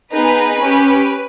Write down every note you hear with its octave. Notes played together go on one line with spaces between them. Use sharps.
B3 D#4 G#4 B4
C#4 G4